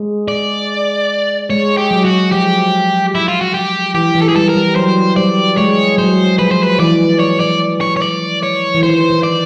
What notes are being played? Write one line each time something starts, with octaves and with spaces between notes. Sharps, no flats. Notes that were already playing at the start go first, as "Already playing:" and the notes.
Already playing: G#3
D5
G#3 C#5
G4
F#3
F#4
F3 G4
E4
F4
F#4
G4
E3 G4
E3
A4
G#4
G3 A4
A#4
G3
F#3 C5
G3 D5
G#3 C#5
F#3 C5
F3 B4
C5
B4
E3 D5
C#5
D5
C#5
C#5
D5
C#5
E3
D#3 C5
D#3
D5